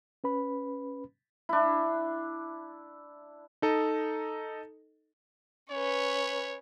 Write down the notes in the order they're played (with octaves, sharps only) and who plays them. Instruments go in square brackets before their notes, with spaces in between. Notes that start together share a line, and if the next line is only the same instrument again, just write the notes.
[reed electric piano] C#4 B4 B5
[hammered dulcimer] D4 E4
[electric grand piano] D#4 A4 D#5
[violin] C#4 B4 [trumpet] C#5